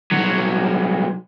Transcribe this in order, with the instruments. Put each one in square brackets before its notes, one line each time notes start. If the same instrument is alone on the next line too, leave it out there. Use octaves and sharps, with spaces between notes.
[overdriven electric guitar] C2 F#3